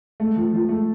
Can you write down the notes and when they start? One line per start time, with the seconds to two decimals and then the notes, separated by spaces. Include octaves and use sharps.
0.20 A3
0.36 F3
0.53 F3
0.69 A3